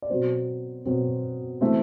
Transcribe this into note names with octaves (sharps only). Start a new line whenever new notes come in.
D5
B2 F#3 C4 C5
B2 F#3 C4
E3 A3 C4 E5